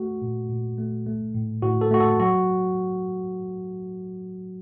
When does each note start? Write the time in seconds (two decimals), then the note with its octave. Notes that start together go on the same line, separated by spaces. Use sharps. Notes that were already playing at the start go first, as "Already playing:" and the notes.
Already playing: A3 F#4
0.22 A#2
0.49 A#2
0.78 A3
1.06 A3
1.35 A2
1.62 A2 F#4
1.81 A4
1.91 A3 F#4
2.00 A4
2.19 F#3 F#4